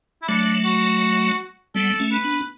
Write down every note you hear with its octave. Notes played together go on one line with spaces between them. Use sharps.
E4
F#3 A3 D4
F#4
G3 B3 A4
A3 C#4
B4
B3 D4